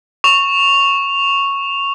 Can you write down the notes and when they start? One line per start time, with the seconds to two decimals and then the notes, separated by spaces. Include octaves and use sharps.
0.24 C#6 F7